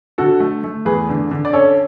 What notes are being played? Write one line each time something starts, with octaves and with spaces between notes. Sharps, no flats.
D3 F#4 A4
A3
A3
E2 G#4 B4
D3
D3
D5
C#4 A4 C#5